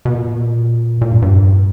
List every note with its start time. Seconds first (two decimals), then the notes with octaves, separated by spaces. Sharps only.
0.05 B2
0.13 A#2
1.01 A#2
1.11 G2
1.22 G2